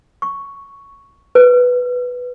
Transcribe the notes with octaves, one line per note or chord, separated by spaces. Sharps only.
C#6
B4